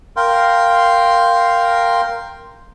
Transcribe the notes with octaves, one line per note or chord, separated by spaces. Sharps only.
A#4 F5 G5 C6